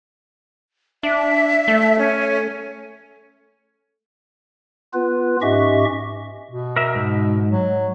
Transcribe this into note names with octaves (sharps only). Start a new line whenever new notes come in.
D4 E5
A3
C#4
B3 F4 B4
G#2 C#4 G4 D#5 E5 C#6
B2
A#4 E5
G#2
F#3